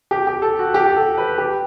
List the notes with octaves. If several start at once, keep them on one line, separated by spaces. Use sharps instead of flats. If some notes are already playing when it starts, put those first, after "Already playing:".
G4
G4
A4
F#4
G4
G4
A4
B4
G4